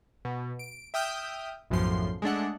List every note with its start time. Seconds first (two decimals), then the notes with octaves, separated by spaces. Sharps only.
0.25 B2
0.59 D7
0.94 E5 G5 D#6 F6 G6
1.70 B1 F#2 A2 F3 C6
2.22 G#3 A3 D4 F#5